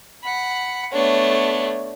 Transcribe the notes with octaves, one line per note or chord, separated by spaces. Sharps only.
F#5 B5
A3 B3 D4 C#5